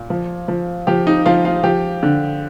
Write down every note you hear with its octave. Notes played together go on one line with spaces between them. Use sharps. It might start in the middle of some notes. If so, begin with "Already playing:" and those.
Already playing: A#2
F3
F3
F3 G4
D#4
F3 F4
F4
F3 G4
D3